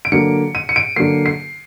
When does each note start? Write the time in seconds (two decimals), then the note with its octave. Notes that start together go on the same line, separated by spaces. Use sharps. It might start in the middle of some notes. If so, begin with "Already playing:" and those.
0.05 D7
0.12 D3 F#3 A#3 C#7
0.55 D#7
0.69 C#7
0.76 D7
0.96 D3 F#3 A#3 C7
1.26 C7